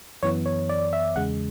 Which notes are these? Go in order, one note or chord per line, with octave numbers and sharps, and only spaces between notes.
F#2 E3 B3 C#5
C#5
D5
E5
E2 C#3 G#3 F#5